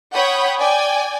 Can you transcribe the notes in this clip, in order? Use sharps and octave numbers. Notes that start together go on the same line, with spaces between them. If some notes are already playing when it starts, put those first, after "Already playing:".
C#5 F#5 G5 B5 D#6 G6
D5 G5 G#5